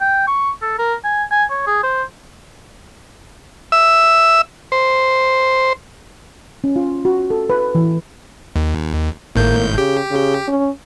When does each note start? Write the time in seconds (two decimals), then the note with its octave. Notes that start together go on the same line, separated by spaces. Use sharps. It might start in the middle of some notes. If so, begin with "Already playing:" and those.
0.01 G5
0.27 C#6
0.62 A4
0.79 A#4
1.04 G#5
1.31 G#5
1.50 C#5
1.67 G#4
1.83 C5
3.72 E5 E6
4.72 C5
6.64 C#4
6.76 F4
7.05 F#4
7.30 A4
7.50 B4
7.75 E3
8.56 D#2
9.36 G#1 A2 A#3 G6
9.78 C#3 G4
10.11 C#3
10.48 C#4